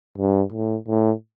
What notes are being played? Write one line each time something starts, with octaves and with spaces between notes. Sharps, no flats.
G2
A2
A2